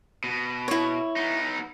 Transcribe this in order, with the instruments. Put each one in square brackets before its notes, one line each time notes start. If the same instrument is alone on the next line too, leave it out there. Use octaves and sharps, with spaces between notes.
[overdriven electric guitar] B2
[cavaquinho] E4 C#5
[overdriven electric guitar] B3 D#4